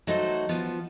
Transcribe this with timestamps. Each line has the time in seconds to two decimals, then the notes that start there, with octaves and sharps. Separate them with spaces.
0.07 F#3 A3 D#4 F#4 A4 C5
0.49 F3 B3 F4